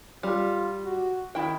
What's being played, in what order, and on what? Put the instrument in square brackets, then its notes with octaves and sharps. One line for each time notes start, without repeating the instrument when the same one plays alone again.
[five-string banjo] G3 [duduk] F4
[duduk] F#4
[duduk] D#3 [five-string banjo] E4 G5